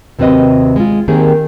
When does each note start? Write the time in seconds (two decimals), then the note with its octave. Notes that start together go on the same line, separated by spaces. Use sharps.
0.19 D#2 C3 F#3 C4 B4 D#5
0.76 G#3 F4
1.08 D#3 A#3 C4 G4 G#4